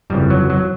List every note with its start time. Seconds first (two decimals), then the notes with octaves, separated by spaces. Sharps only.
0.10 G1 F2 C#3 E3 G3
0.30 F#3
0.50 F#3